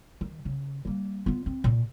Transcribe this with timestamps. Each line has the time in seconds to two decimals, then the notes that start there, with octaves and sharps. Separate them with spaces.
0.21 D#3
0.45 C#3
0.85 G3 A#3
1.26 B3 F4
1.46 C4
1.64 A#2